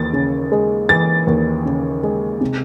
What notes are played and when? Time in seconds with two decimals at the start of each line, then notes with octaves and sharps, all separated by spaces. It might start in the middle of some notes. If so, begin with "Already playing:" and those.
Already playing: D#2 E3 A6
0.13 C#3
0.52 G#3
0.89 E3 A6
1.27 D#2
1.65 C#3
2.03 G#3
2.41 C3